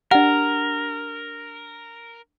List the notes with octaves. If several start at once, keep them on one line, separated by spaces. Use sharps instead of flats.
D4 G4 A#4 F#5